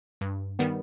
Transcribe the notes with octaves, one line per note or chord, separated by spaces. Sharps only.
G2
D#3 G3 B3